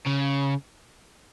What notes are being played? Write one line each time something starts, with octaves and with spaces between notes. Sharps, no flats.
C#3